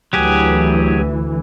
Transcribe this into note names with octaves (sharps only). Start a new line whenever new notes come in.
D2 E3 F#3 G4 G#4